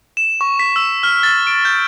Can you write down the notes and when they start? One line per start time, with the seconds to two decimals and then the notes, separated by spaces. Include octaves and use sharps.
0.17 E7
0.41 C#6
0.59 B6
0.76 E6
1.03 F6
1.23 A6
1.47 D7
1.65 G6